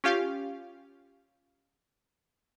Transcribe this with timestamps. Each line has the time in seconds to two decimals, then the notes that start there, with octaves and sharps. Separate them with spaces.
0.04 C#4 F4 G4 F5